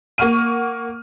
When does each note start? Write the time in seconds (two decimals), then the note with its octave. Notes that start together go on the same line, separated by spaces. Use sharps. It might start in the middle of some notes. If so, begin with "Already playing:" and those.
0.18 A#3 F#5 C#6 F6 D#7